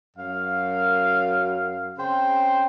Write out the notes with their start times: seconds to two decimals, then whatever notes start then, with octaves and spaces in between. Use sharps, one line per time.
0.17 F#2 F5
1.98 C#3 C4 C5 G5 C6